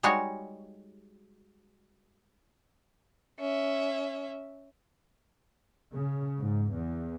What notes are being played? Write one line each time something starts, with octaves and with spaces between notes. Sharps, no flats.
G3 G#3 D#4 F#4 C#5
C#4 E5
C#3
G#2
E2